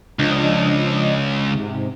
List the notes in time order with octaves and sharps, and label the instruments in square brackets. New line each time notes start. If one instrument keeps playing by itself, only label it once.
[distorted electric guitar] C#2 [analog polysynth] F3 D4 D#5
[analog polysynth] G#2 C3